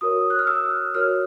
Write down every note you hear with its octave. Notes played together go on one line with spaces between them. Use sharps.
F#4 A#4 C#5 D#6
F#6
F6
E6
F#4 A#4 C#5 F6